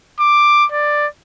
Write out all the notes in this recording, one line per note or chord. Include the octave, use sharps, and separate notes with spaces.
D6
D5